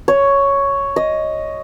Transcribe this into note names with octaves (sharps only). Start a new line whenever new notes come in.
C#5
D#5